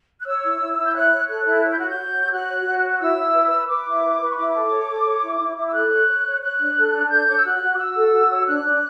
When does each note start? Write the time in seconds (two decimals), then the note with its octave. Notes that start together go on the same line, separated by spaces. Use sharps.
0.21 F#6
0.26 C#5 E6
0.44 E4
0.61 E4
0.77 E4
0.86 G6
0.95 C#5 F#6
1.12 C#5
1.29 A4 F#6
1.46 E4
1.63 C#5
1.71 G6
1.79 F#4 F#6
1.88 G6
1.97 F#4
2.15 C#5
2.26 E6
2.31 F#4 F#6
2.49 C#5
2.65 F#4
2.83 C#5
2.90 F#6
3.00 E4 E6
3.17 E4
3.34 B4
3.51 B4
3.68 B4 D6
3.86 E4
4.03 B4
4.20 B4
4.31 C#6
4.37 E4 D6
4.54 A4
4.71 C#5
4.88 A4
5.05 C#5
5.22 E4
5.40 E4
5.56 E4
5.68 E6
5.73 A4 F#6
5.90 C#5
6.08 C#5
6.25 C#5
6.42 C#5 F#6
6.59 D4
6.76 A4
6.93 D4
7.10 A4 G6
7.28 C#5 D6
7.36 E6
7.44 F#4 F#6
7.62 F#4
7.75 D6
7.78 F#4 E6
7.96 A4
8.13 F#4
8.30 C#5
8.47 D4 F#6
8.64 D4